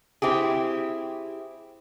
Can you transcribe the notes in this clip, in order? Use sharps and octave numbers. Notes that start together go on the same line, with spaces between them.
C4 E4 G4 G#4